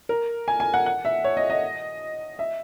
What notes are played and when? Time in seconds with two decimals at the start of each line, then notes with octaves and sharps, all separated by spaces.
0.09 A#4
0.48 G#5
0.60 G#5
0.74 F#5
0.86 F#5
1.05 E5
1.24 C#5
1.37 D#5
1.50 D#5
2.39 E5